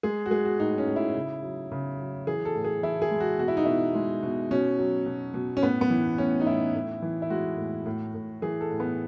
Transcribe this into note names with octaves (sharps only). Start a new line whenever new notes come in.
G#3 G#4
F#4
G#3 G#4
F#4
A2 D#4
C#4
A2
E4
C#3
F#3
C#3
F#3
E3 G#4
A4
A2
G#4
E3 E4
G#4
G#3
F#4
B2 F#4
E4
D#4
B2 E4
G#3
B2
B2 C#4
F#3
B2
B2
C#4
A2 B3
B3
E3
A2 C#4
D#4
A2 E4
A2
E3
E4
G#3 F#4
A2
A2
A2
E3 G#4
A4
A2
B3